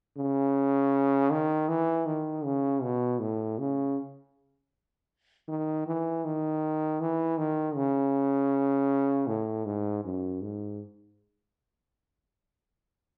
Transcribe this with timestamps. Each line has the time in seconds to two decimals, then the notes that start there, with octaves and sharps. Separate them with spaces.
0.17 C#3
1.30 D#3
1.69 E3
2.06 D#3
2.44 C#3
2.82 B2
3.20 A2
3.59 C#3
5.48 D#3
5.86 E3
6.25 D#3
7.00 E3
7.38 D#3
7.76 C#3
9.27 A2
9.65 G#2
10.04 F#2
10.42 G#2